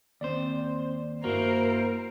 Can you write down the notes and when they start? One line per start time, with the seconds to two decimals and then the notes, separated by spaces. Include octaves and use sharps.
0.21 D#2 C4 C5 D5
1.24 G2 A#3 E4 F#4 A#4 C5 A#5